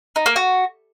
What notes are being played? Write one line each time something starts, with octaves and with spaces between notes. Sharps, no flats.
D#4
A#3
F#4